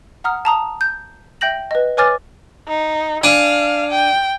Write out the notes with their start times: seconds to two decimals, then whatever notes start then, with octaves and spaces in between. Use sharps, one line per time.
0.24 F#5 A#5 D#6 F6
0.45 A5 A#5 D#6
0.81 G6
1.41 E5 G5 G6 A#6 F#7
1.71 B4 D#5
1.97 B4 C#5 G#5 D6 F6 A6
2.67 D#4
3.24 D4 F5 G#5
3.91 G5